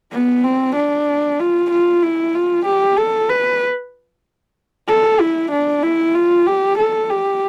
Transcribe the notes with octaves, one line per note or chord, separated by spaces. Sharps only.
B3
C4
D4
F4
F4
E4
F4
G4
A4
B4
A4
E4
D4
E4
F4
G4
A4
G4